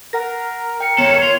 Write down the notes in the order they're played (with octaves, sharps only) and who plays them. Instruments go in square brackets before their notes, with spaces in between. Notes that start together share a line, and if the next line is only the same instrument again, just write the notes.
[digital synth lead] A#4 [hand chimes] F#5 A#6
[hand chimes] G5 C#7
[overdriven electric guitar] D#2 A4 [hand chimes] B3 [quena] C#5
[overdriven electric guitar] F4